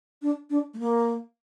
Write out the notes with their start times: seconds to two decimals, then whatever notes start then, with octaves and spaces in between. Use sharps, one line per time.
0.22 D4
0.50 D4
0.74 A3
0.79 A#3